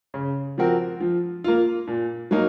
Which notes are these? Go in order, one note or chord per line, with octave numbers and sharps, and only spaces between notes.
C#3
F3 C4 F#4 A#4
F3
A#3 F4
A#2
F#3 A#3 D#4